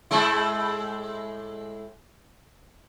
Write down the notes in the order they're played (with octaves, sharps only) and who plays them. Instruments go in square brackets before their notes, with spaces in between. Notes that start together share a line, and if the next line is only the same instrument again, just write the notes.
[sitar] A2 G#3 E4